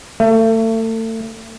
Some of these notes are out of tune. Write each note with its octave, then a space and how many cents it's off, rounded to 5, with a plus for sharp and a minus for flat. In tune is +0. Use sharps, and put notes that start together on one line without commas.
A3 +30